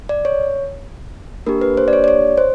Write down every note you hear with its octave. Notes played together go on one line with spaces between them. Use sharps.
D5
C#5
A#3 D4 G4 A#4
B4
C5
D5
C#5
D5
C#5
C5